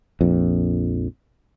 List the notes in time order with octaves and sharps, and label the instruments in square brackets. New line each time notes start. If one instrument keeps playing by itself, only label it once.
[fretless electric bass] A#1 F2